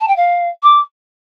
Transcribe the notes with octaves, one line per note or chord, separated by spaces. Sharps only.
A5
G5
F5
D6